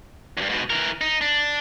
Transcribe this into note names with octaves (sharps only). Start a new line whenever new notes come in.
E2 G2
G#2 B2
E3 A#4
D#4
D4